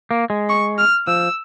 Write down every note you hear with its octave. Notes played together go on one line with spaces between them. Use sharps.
A#3
G#3
C#6
F6
F3 E6